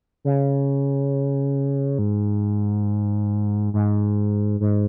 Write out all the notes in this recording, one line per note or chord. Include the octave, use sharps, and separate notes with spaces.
C#3
G#2
G#2
G#2